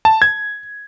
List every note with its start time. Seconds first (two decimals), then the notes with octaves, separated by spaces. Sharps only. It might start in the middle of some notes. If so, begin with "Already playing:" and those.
0.05 A5
0.22 G#6